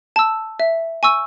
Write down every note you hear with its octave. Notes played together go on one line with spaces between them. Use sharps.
A5 E6
E5
G#5 C#6 E6